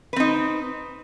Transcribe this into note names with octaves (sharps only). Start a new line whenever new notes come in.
C4 D#4 B4